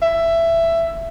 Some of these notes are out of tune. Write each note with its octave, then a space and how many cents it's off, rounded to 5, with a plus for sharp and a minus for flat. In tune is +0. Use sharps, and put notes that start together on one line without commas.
E5 +15